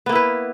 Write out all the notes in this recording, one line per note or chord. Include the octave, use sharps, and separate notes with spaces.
A#3 B3 E4 B4